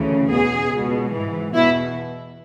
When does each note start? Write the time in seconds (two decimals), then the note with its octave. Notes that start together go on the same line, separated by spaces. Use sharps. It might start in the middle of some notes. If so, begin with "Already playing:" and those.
Already playing: D2 C#3 E3
0.29 E2 B2 G#4
0.71 C#2 B2
1.12 G#2 E3
1.53 E2 B2 E4